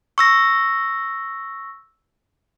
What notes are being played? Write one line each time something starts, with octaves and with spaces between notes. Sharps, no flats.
C#6 E6 A#6